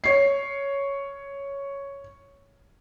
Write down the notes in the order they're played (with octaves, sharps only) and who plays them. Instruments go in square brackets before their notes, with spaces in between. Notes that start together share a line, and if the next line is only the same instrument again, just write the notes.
[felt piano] C#5 C7